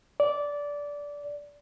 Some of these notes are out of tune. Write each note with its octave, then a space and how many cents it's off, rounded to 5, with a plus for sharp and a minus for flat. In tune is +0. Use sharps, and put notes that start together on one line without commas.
D5 -15